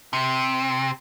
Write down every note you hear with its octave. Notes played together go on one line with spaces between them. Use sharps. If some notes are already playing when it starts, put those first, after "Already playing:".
C3